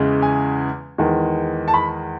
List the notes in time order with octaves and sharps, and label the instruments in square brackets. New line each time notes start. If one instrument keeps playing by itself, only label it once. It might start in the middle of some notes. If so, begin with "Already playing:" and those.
Already playing: [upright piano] E2 C#3 E3 G#3
G#5
E2 D#3 G#3
A5
B5